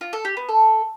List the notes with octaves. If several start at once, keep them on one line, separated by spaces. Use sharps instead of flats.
F4
A4
G4
B3
A4